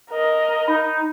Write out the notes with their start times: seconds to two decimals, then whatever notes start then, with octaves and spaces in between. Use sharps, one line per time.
0.10 A#4 D#5
0.68 D#4 B5